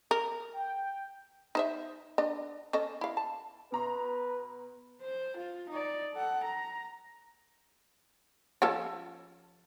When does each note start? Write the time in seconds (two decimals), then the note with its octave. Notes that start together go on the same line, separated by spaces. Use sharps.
0.11 A#4
0.53 G5
1.55 D#4 C5 E5
2.18 D4 D#5
2.73 C#4 A4 D#5
3.01 E4 F5
3.17 A5
3.72 B2 B4 A#5 C6
5.01 C5
5.36 F4
5.69 D#4 D5
6.13 A4 F#5
6.44 A#5
8.62 F3 C#4 A4